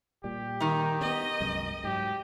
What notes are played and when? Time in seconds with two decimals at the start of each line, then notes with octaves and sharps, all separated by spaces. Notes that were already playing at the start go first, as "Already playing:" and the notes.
0.24 A#2 G3 G4
0.60 D#3 D#4
1.01 B3 C#4 D#5
1.40 C2 F#2 G#3
1.84 G#2 F#3 G4